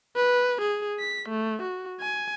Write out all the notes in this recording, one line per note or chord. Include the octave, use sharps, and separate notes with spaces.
B4
G#4
B6
A3
F#4
G#5